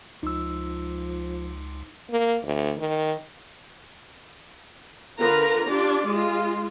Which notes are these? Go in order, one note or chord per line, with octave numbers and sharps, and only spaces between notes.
C#2 F3 D#4 E6
A#3
D2
D#3
D3 F4 A#4 B4 A#5
D4 F4 G4 D5
G#3 F4